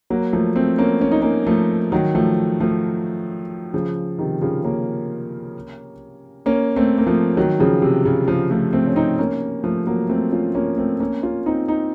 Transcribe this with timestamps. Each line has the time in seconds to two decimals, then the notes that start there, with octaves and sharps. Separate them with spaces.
0.10 F#3 A#3
0.33 F3 A3
0.56 A3 C4
0.78 A#3 C#4
1.01 C#4
1.11 D#4
1.22 A#3 C#4
1.47 F3 A3
1.92 D#3 F#3
2.15 F3 A3
2.60 F3 A3
3.74 C#3 F3
4.18 C3 D#3
4.42 C#3 F3
4.64 A#3 C#4
6.46 A#3 C#4
6.76 A3 C4
6.98 A#3
7.07 F3 A3
7.37 D#3 F#3
7.60 C#3 F3
7.82 C3
8.05 C#3
8.28 C#3 F3
8.51 F3 A3
8.73 A3 C4
8.87 C#4
8.96 C4 D#4
9.19 A#3 C#4
9.64 F3 A3
9.87 F#3 A#3
10.09 A3 C4
10.32 C#4 F4
10.55 A#3 C#4
10.78 A3 C4
11.00 A#3 C#4
11.23 C#4 F4
11.46 C4 D#4
11.68 C4 D#4